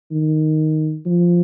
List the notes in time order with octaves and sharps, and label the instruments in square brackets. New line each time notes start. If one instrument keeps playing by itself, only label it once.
[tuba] D#3
F3